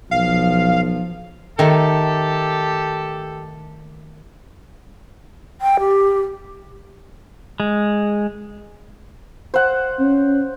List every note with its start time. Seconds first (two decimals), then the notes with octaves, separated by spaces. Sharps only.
0.11 B1 F3 F5
1.59 D#3 A3 G4 A4
5.61 G5
5.80 G4
7.60 G#3
9.54 C5 F#5
10.00 C#4